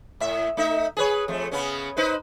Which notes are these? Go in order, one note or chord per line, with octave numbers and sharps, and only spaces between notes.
A2 E5
A3 D#4 E5
G#4 B4 C#5
F2 A3
C#3 B3 C#4
D#4 B4 C5